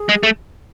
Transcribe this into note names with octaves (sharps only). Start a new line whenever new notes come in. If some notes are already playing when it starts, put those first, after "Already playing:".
Already playing: G#4
G#3
A3